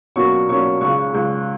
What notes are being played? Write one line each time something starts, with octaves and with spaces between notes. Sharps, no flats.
B2 F#3 A#3 C#4 C#6
C#6
B2 F#3 A#3 C#4 C#6
C#2 C#3 G#3 C#6
C#2 C#3 G#3